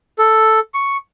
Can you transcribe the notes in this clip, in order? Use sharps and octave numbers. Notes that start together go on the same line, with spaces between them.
A4
C#6